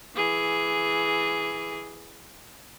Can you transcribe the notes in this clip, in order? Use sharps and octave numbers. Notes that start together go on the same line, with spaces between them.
E3 G#4